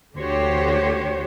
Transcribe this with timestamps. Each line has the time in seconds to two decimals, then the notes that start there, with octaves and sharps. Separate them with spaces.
0.17 D2 D3 F#4 G4 C5 C#5